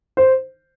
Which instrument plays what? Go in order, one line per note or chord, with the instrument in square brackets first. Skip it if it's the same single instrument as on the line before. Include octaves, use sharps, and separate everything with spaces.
[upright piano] C5